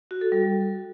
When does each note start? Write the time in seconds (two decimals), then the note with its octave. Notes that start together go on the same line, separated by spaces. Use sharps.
0.11 F#4
0.21 A4
0.32 G3